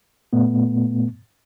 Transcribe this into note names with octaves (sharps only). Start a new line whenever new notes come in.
A#2 A3 B3